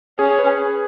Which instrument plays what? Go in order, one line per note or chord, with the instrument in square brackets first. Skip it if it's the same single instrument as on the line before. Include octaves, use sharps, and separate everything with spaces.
[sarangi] C#4 [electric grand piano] G#4
[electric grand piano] B4